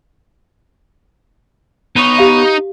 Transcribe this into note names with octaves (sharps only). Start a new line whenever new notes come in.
B3 D#4 B4 C#5
G4 F5